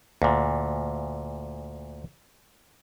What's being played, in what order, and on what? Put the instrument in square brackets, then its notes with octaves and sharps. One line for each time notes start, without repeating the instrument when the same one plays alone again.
[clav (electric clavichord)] D2 A#2